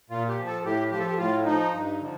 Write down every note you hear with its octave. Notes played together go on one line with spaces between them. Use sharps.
A#2 F4
G4
F3
A4
A2 G4
F3 G4
A4
G4
A2 F4
F3 D#4
G2
D3 F3